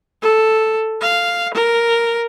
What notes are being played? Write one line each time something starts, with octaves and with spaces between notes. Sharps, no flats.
A4
F5
A#4